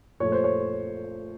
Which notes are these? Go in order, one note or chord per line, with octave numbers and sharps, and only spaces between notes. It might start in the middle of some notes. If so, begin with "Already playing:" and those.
A#2 F3 A3 C#5
C5
C#5